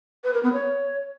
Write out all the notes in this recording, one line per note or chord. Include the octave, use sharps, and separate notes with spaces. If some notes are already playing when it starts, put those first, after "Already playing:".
B4
A#4
B3
C#5